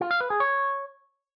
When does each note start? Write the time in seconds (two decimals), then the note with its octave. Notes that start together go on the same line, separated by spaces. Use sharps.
0.01 F4
0.11 F5
0.20 B4
0.30 G#4
0.40 C#5